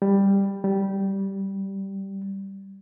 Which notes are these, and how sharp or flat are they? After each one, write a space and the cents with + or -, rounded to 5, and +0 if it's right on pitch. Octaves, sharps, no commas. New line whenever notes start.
G3 +10
G3 -10